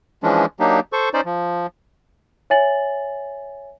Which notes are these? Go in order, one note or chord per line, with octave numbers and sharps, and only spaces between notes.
E3 F3 G#3 C#4 D4
F#3 A#3 D4 D#4 G4
A4 C5 C#6
C#4 D#4 C5 D5
F3
C#5 E5 G#5 A6 F#7